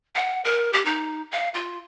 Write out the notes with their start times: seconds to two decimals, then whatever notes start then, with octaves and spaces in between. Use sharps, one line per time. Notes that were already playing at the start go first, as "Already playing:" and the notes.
0.15 F#5
0.45 A#4
0.73 G4
0.85 D#4
1.32 F5
1.54 F4